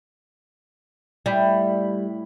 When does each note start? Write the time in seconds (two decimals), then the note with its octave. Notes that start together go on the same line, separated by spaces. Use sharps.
1.26 A2 G3 B5